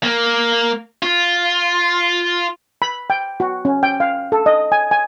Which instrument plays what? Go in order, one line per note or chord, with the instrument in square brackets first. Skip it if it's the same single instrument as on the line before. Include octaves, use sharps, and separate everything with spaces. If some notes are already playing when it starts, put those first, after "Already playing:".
[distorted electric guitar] A#3
F4
[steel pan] B5
G5
F#4
C#4
G5
F5
A4
D#5
G#5
G#5